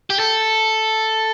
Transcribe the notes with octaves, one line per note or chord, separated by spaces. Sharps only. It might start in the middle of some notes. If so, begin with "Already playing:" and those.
G4
A4